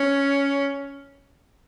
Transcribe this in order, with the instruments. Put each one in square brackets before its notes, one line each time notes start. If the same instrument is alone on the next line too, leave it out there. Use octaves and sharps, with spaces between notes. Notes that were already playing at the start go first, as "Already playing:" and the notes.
Already playing: [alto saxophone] C#4